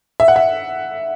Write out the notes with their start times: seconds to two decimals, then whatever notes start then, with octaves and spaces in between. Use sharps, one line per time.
0.20 E5
0.28 F#5
0.36 E5